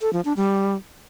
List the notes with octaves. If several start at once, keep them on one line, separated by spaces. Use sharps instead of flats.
A4
F3
D4
G3